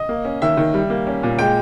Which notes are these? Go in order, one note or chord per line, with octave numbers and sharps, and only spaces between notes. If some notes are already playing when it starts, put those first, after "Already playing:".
Already playing: D#5
A#3
C#4
D#3 E5
D#3
G3
A#3
C#4
A#2
G#3 G5